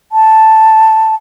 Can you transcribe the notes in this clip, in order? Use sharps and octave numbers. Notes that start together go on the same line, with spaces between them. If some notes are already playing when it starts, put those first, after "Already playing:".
A5